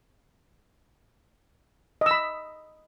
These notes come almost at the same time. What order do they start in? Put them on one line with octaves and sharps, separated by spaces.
D#5 E6 B5